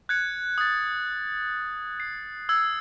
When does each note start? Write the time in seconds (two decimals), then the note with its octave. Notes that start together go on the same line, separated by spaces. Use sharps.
0.09 F#6 G#6 C#7
0.58 D#6 A6
2.00 C7
2.49 E6 G#6